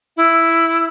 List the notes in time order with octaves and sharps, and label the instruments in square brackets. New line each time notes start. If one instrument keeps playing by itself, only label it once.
[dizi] E4